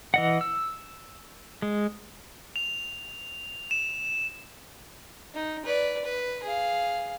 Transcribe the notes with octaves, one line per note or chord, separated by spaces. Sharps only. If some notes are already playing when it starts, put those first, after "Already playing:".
E3 D#5 F#5
E6
G#3
F7
E7
D#4
B4 D5
B4
G#4 F5